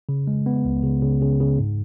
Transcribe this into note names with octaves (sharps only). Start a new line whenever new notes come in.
C#3
G#3
B3
C#2
C#3
C#3
C#3
C#3
G#2